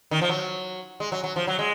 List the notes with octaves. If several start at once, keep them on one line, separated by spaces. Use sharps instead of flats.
D#3
F3
F#3
G#3
F#3
F#3
F3
F#3
G#3